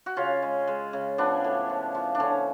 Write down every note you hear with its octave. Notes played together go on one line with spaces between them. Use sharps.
F#4
C#3 C#4 F4
G#3
G#3
C#3
F3 B3 D4
A2
F3
F3
D4
D3 C#4